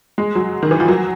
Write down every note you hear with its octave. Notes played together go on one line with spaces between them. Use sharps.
G#3
F#3
D#3
E3
F3
F#3